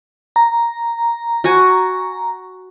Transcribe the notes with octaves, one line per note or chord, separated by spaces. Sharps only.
A#5
F#4 F#5 G#5